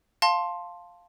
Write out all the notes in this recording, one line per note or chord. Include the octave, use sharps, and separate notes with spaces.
F5 A5 C6